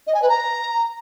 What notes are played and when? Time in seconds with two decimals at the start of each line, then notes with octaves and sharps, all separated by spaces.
0.07 D#5
0.14 G#5
0.21 B4
0.29 A#5